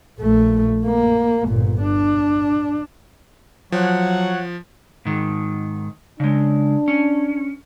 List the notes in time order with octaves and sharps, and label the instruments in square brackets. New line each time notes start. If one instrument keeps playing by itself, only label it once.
[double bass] A#1 A3
A#3
G1 A#2
D4
[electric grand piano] F3 [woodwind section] F#3 [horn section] C#5 F#5
[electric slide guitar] G#2 D#3
[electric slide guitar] C#3 G#3 [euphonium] D4
[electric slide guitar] C#4